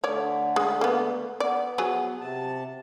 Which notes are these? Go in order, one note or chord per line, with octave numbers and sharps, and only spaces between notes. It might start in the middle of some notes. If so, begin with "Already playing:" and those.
D3 A3 C#5 D5
G#3
A#3 B3
B3 D5
F3 F#3 G#4
C3 A5